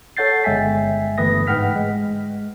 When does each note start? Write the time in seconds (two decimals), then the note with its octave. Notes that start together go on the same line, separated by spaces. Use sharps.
0.17 A4 C#5 F#5 G6 A6 C7
0.44 G1 G#3 E5 G5 G#5 B6
1.18 G1 E3 A3 B4 D#6 A#6
1.47 G#2 B4 F#5 G5 F6 B6
1.75 G#3